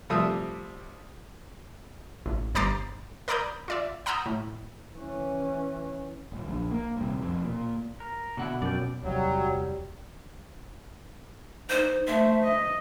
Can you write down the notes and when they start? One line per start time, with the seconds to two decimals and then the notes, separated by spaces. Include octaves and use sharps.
0.10 C3 F3 G3 A3 E5 D#6
2.26 A1
2.55 G1 C5 A#5 D6 A6 C7
3.28 A#4 D5 A#5 B5 D#6 G6
3.68 F4 D5 E5
4.06 F#5 A#5 B5 D#6 E6 G6
4.26 A2
4.95 E3 C#4
6.32 D#1
6.48 A#1
6.71 A#3
6.97 D#1 C2 C3
7.22 E1 F2
7.43 A#2
8.00 A#4
8.37 B2 D3 E4 F#5
8.62 F#2 D5 G5
9.03 D1 E2 C3 F#3 G3
11.70 D#4 C5
12.07 A3 C5 E5
12.44 D#5